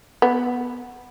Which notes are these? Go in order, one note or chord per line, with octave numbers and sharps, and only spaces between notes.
B3